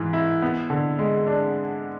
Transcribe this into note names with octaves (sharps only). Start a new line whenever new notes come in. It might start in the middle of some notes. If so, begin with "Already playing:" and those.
Already playing: G#2 E3
E4
B3
D3
G#3
D4